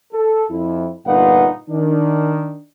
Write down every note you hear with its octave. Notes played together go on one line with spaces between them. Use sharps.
A4
F2 E4
G1 A#2 D#4 B4 F5 F#5
D#3 D4